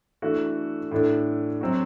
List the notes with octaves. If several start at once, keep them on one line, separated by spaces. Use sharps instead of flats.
E3 A3 D4 F#4
A2 E3 A3 D4
F#3 C4 F#4